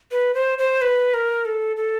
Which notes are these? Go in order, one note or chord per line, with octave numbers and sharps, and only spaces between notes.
B4
C5
C5
B4
A#4
A4
A4